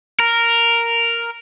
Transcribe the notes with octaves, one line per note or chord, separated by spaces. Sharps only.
A#4